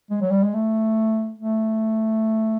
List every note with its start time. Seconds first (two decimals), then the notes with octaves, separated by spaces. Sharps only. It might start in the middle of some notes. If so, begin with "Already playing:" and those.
0.10 G#3
0.21 F#3
0.31 G3
0.42 G#3
0.53 A3
1.38 A3